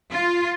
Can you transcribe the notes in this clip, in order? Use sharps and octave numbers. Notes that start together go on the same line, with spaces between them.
F4